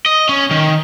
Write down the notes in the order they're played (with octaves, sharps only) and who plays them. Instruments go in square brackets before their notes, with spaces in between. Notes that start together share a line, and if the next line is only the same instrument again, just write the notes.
[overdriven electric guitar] D#5
C#4
D#3